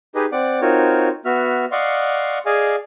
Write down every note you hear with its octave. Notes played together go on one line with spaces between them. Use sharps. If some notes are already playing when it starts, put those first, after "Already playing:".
D#4 G4 G#4 B4 D#5
C4 D5 F#5 D6
C4 D#4 F4 F#4 A#4 C#5
B3 F#4 E5 F6
D5 D#5 F5 F#5 C6 C#6
G#4 D5 D#5 F5 G#5